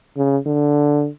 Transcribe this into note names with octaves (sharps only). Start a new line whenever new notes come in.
C#3
D3